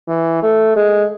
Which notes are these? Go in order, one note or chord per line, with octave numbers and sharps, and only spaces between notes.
E3
A3
G#3